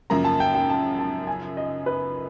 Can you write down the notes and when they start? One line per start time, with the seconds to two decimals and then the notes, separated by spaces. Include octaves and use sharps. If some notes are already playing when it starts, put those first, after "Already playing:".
0.10 F#2 C#3 F3 A#3 A#5
0.25 A5
0.40 G5
0.55 G5
0.70 A5
0.99 A5
1.27 G#5
1.57 D#5
1.86 B4